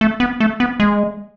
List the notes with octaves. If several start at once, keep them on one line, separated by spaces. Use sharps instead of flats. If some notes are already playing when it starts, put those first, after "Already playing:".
A3
B3
A3
B3
G#3